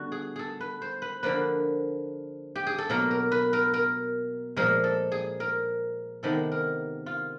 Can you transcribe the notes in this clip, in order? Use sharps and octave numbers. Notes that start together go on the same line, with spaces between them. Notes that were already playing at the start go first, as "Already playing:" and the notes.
Already playing: D3 G3 B3 F#4
G#4
G#4 A4
B4
C5
B4
D3 F3 A#3 B4
G4
G#4
A4
B2 F#3 A#3 A#4
A#4
B4
A#4
A#4
A#2 F3 G#3 A#4
A4
G#4
A#4
C3 D#3 G#3 B3 A4
A#4
F4